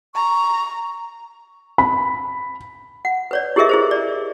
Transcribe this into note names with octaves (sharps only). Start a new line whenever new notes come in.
A#5 C#6
B5
F#5
B4 C#5 D5
E4 G4 G#4 A#4 D#5 E5
E4 G#4 C5
D5